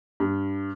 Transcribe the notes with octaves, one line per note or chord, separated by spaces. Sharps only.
G2